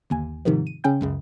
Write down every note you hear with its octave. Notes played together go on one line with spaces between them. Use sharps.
G1 D#2 G#5
G#2 C3 D#3 F3
D#7
C#3 C#4 G5 G6
C#2 F#2 C#3